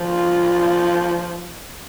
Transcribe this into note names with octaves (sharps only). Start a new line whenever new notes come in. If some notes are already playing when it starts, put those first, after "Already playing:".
Already playing: F3 F4